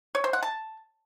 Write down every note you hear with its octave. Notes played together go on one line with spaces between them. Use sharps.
C#5
C5
F#5
A5